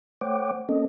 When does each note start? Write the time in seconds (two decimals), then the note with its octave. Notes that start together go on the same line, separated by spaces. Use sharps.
0.21 A3 C5 C#5 F#5 G5 D6
0.69 A#3 C4 C#4 A4 D#5